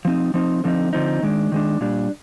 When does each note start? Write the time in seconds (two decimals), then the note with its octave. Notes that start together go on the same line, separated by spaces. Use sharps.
0.05 F3 C4 D#4
0.34 F3 C4 D#4
0.64 D3 F3 C4 D#4
0.93 D3 F3 C4 D#4
1.23 D#3 G#3 D4
1.52 D#3 G#3 D4
1.81 A#2 G3 D4